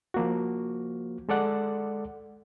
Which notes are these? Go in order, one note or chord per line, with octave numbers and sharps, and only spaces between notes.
F3 A#3 F#4
G#3 A4 D5 F#5